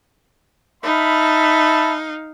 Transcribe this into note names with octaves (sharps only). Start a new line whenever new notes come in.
D#4 E5 F5 A5 B5